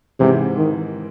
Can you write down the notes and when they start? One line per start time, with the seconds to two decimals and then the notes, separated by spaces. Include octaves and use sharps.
0.20 G#2 C3 E3 G#3 C4
0.58 D#3